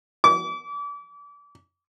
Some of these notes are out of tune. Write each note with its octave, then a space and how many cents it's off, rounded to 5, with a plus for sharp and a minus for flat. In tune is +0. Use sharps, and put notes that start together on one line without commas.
D6 -35